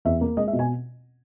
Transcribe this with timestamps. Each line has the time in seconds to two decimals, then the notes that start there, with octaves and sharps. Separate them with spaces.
0.05 E2 E5
0.21 A#3
0.37 G#3 D#5
0.48 E5
0.53 B2
0.59 G#5